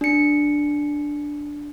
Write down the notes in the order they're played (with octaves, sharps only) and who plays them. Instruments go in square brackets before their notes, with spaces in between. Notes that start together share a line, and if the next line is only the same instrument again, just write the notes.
[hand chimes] D4 C#7